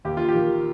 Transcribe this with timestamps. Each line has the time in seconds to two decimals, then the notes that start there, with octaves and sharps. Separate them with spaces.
0.05 D#2 G4
0.17 F4
0.29 G4
0.35 D#3